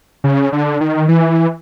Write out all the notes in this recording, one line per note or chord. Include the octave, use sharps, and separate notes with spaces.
C#3
D3
D#3
E3